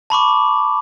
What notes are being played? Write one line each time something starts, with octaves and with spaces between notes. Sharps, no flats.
A5 B5 C#6 D6